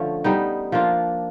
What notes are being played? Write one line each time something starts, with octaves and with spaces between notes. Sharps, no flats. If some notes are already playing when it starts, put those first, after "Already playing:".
Already playing: D3 F3 A3 C#4
G3 B3 D#4
F3 A#3 D4 F4